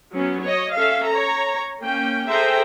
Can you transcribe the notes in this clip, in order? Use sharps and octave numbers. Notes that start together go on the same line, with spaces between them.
F#3 B3 C#4
C#5 D#5
C#4 A4 E5 F5
C#5 A#5
A#3 C#4 G5
G#4 A4 C5 E5 G5 A#5